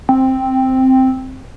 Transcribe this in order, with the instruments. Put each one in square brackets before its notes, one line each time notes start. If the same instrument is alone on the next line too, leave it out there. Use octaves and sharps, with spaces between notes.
[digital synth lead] C4